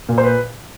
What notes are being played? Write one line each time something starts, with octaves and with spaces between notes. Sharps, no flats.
A#2
C5
B4